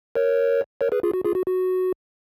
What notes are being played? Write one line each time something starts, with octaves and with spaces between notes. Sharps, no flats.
A#4 C#5
A#4 C#5
G#4 B4
F4 G#4
F#4
F4 G#4
F#4
F#4